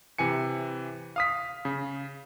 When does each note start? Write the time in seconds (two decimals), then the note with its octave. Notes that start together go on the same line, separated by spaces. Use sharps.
0.18 C3 E3 G#5 C#7
1.16 F5 D#6 B6
1.65 C#3